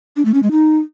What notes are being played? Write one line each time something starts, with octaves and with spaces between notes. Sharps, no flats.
D4
A3
C#4
G#3
D#4